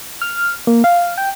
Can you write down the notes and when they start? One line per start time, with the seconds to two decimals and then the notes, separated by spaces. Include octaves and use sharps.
0.22 F6
0.67 A#3
0.84 F5
1.18 G5